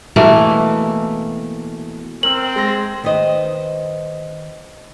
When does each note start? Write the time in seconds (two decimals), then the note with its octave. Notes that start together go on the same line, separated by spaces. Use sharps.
0.16 B2 E3 A3 A#3
2.23 C4 A#4 E6 F#7
2.56 G#3 C6 A#6
3.04 D#3 B4 C5 D#5